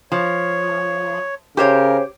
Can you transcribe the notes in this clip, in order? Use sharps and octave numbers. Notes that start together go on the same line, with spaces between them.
F3 C#5
C#3 G4 A#4 C5 C#5